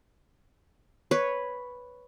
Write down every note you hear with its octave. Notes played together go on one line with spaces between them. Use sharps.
B4 C#5